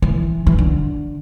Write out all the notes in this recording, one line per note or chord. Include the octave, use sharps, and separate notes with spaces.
E3
E3
D3